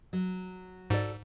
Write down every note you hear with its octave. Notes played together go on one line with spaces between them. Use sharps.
F#3
G#2 F#4 A4 D5